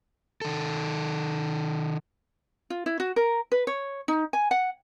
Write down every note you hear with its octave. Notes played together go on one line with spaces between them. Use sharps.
D#3 A4
F4
E4
F#4
A#4
B4
C#5
D#4
G#5
F#5